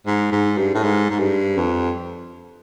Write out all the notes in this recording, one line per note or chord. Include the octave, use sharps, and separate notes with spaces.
G#2
G#2
G2
A2
G#2
G#2
G2
F2